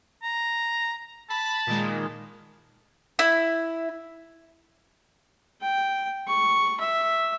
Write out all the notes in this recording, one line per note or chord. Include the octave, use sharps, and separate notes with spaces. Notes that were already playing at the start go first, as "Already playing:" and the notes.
A#5
A5 B5
A#2 D#3 G#3
E4
G5
C#6
E5